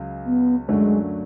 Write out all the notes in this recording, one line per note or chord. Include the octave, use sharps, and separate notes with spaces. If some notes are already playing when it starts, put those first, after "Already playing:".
Already playing: C#2 C#3 F#3
B3
F#2 D3 F#3 G#3 A3 D4